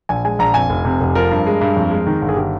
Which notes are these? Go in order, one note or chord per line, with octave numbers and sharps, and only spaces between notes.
A#1 G#5
G#3 G#5
A#1 A#5
F2 G#5
F1
C3
F1
F3 A#4
G2
G#3
G2
F2
G#3
D#3
G1
G#4
D#3 G4